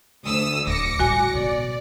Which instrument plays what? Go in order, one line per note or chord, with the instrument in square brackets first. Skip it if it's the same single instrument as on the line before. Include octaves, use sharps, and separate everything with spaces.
[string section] D2 D#6 E6
[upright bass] D1 [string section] D6 A#6 C#7
[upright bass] A2 G3 [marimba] F#4 G#5
[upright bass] B2 [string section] D5